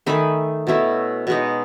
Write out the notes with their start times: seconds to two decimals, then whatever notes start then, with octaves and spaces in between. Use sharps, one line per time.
0.06 D#3 A3 D#4 G#5 B5
0.67 B2 A3 C#4 E4
1.27 B2 G#3 D#4